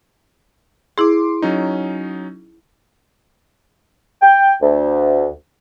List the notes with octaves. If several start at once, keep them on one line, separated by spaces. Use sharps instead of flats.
E4 G#4 C6 D6
F#3 C#4 D#4
G5
D2